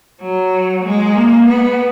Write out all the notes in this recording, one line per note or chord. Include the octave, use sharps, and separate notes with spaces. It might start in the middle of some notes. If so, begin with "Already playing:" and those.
F#3
G#3
A#3
B3